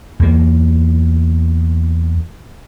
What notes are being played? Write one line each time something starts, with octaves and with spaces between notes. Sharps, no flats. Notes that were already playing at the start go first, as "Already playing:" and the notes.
E2 A#3